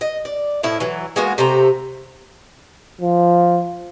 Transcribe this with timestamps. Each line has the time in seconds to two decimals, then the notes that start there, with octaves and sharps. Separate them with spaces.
0.01 D#5
0.25 D5
0.63 A2 F3 E4
0.80 E3 F#3
1.16 G#3 A#3 B3 F#4
1.38 C3 A3 C5 A#5
3.01 F3